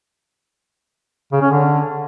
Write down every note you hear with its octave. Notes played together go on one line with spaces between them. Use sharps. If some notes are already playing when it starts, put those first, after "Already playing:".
C#3
C#4
D3